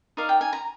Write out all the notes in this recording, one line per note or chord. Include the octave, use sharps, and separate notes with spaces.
D#4 A#4 D5 F5
G5
G#5
A#5